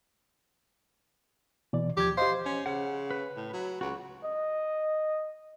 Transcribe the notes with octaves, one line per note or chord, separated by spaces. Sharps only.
B2 E3 D5
D#2 F3 G4 G#6
G4 C5 D#5 F5
C#4
C#3 F#5
B4
A2
F#3
C#2 F#4
D#5